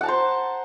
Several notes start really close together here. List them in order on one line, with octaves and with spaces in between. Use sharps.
F#5 A5 A#5 C5